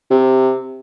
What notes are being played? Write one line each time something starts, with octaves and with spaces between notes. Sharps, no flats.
C3